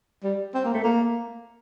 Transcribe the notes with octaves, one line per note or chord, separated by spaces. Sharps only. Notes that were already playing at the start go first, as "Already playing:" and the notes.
G3
C4
A#3
A3
A#3